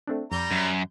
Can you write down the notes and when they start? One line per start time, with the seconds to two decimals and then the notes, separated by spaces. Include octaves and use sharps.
0.07 A3 C4 D4
0.32 F2 G3 A#5 G6
0.51 F#2